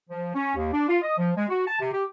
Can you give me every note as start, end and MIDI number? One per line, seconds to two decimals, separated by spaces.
0.10 0.31 53
0.34 0.55 61
0.56 0.69 39
0.73 0.87 62
0.88 0.98 65
1.02 1.15 75
1.18 1.31 53
1.37 1.46 56
1.49 1.65 66
1.67 1.79 81
1.80 1.91 48
1.92 2.04 67